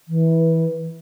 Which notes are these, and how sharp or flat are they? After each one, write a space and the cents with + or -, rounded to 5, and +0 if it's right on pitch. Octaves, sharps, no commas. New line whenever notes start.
E3 -20